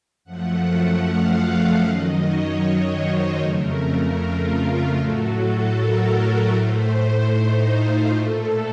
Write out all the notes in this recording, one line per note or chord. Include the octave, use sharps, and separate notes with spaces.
F#2 F3 A3 F#5
F#5
F5
F#2 D#3 F#3 D#5
C#5
C#5
C5
F2 C#3 A3 A#4
F4
A2 F#3 A3 F#4
A4
A#4
A2 A3 C5
D#4
F4
A#2 A3 A4